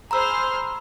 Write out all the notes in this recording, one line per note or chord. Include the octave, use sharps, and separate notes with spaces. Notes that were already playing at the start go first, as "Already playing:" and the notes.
G#4 C5 A#5 B5 E6 F6